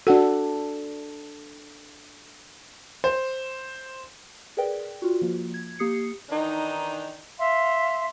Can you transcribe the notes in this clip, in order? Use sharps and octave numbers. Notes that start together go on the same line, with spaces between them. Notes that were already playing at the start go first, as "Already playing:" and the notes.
D4 F#4 A4 F#5
C5
G#4 A#4 B4 D5 G5
F4 F#4
F3 A#3
G#6
A#3 G4 D#6 C7 C#7
D#3 E3 D4 D#4
E5 F5 C6